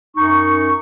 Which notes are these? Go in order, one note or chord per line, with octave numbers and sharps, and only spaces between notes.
F#2 D#4 C#6